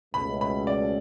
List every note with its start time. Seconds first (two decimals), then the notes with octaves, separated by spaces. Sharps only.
0.13 C#2 B2 A3 B5
0.41 B5
0.67 D5